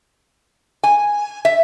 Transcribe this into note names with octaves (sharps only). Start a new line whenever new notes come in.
G#5
E5